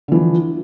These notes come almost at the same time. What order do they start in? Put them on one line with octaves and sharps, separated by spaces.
D3 E3 F3